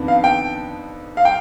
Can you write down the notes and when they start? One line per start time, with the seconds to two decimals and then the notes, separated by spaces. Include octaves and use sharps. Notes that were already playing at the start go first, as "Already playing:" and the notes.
Already playing: F2 D#3 B3 D4
0.08 F5
0.24 G5
1.17 F5
1.25 G5